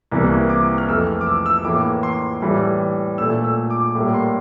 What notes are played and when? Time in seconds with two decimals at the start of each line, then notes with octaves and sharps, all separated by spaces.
0.11 C2 C3 E3 A#3
0.49 D6
0.78 F6
0.88 F2 E3 A3 E6
1.07 F6
1.21 D6
1.26 E6
1.46 E6
1.64 A2 E3 A#3 D6
2.03 C6
2.42 A2 E3 G3
3.18 A#2 A3 E6
3.44 E6
3.70 D6
3.95 A2 G3 A#3 D6
4.14 C6